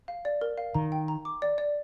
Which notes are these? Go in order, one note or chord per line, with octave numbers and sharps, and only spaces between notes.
F5
D5
A#4
F5
D#3 A#5
G5
A#5
D6
D5
D5